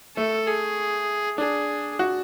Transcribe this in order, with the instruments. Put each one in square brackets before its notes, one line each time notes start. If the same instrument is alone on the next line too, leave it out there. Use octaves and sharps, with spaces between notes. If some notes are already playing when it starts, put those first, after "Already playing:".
[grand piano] A3 [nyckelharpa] A4
[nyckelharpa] G#4
[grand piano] D4 [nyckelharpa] G#4
[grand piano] F#4